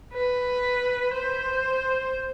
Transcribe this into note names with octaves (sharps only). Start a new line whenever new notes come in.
B4
C5